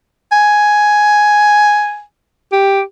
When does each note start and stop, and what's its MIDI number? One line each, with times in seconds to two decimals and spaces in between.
0.32 2.01 80
2.52 2.81 67